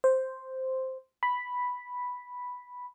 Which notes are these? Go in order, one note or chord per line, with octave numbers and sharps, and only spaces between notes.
C5
B5